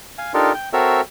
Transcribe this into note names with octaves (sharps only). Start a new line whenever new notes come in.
F5 G#5
D4 D#4 F4 G4 A4 A#4
G5
C4 F#4 A4 A#4 C#5 E5